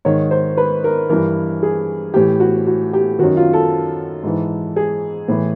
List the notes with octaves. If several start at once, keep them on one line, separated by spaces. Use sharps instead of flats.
G#2 D#3 C#5
C5
B4
A#4
G2 E3 A#4
G#4
A2 E3 G4
F#4
F#4
G4
F#2 D#3 F#4
F4
A4
G#2 E3
G#4
A2 E3